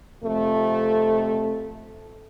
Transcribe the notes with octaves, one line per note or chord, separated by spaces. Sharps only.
F2 C3 A3